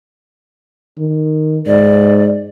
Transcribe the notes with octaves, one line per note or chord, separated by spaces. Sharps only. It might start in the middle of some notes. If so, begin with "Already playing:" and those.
D#3
G#2 D5